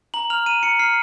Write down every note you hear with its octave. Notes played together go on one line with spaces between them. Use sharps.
A#5 F#7
F6 F7
A#5 D#7
A#5 C#7
F6 C7